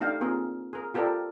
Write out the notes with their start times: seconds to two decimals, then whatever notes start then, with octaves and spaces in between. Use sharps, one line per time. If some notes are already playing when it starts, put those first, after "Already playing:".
0.01 A3 D4 D#4 G4 F5 G5
0.21 A#3 C4 F4 G#4 A#4
0.73 G#4 A#4
0.94 F4 G4 A4 A#4 D5